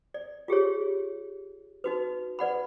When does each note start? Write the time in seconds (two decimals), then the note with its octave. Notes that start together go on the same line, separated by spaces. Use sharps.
0.14 D5
0.48 F4 G4 G#4 C#5
1.84 D#4 F#4 B4
2.39 B4 D5 F#5 B5